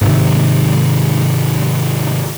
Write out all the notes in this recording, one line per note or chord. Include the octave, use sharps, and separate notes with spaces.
G#2 C3 D#3